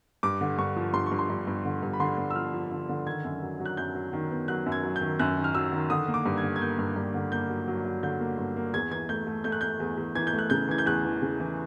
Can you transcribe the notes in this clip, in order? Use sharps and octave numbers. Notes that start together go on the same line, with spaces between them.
G2 D6
D3
G2 C#6
F3
G2 C6
G2 C#6
C6
G2
G2
D3
G2
B5
D3 C6
G2
E6
F3 F6
F3
D3
D3
D#3 G#6
F#2
F#3
F#3
F#6
F#2 G6
F#3
D#3
B3
F#3 F#6
F#2
G#6
F#3
G6
D#3
F#2 F#6
D#3
F6
F#3 E6
D#3
D3 D#6
A#3
D6
G2
G#6
D3
G#6
A#3 G6
G2
G2
D3
A#3 G6
F#3
F#3
F#3
D3 G6
A#3
G2
A#3
E2 G#6
E3 G#6
A3 G6
A3
A3 G6
F#6
A3 G6
E2
E2
E3 G#6
G6
A3
F#6
C#3 G6
E3 G#6
G6
E2 F#6
E3
C#3
E3